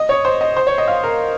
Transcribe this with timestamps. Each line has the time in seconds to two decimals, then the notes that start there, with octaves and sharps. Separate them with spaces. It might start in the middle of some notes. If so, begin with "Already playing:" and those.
Already playing: D#5
0.09 C#5
0.25 C5
0.41 D#5
0.57 C5
0.67 C#5
0.78 D#5
0.88 F5
1.04 A#4